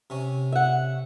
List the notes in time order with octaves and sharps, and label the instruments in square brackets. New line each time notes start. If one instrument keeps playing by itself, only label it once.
[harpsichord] C3 C#4
[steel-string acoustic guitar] E5 F#5